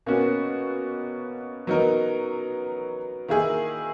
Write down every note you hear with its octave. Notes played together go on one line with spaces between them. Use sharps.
B2 A#3 C#4 F#4
F#3 B3 D#4 A#4
D#3 A#3 E4 G#4